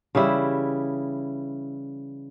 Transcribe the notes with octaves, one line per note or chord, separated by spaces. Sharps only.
C#3 E3 G3 E4